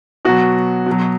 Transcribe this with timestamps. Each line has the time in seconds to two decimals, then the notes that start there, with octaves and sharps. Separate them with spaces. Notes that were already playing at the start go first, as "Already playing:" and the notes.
0.25 B2 F#3 F#4
0.86 B2
0.91 F#3